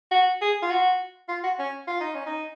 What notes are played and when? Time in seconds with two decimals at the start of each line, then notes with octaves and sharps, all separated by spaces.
0.12 F#4
0.42 G#4
0.62 F4
0.71 F#4
1.29 F4
1.44 F#4
1.59 C#4
1.87 F4
2.01 D#4
2.14 C#4
2.27 D#4